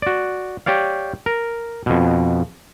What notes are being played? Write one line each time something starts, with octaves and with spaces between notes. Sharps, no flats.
F#4 D5
G4 C#5 D5 F5
A#4
F2 B2